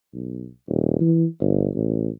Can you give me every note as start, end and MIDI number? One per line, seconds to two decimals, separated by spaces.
0.14 0.50 35
0.68 0.97 27
1.00 1.26 52
1.41 1.69 31
1.75 2.09 33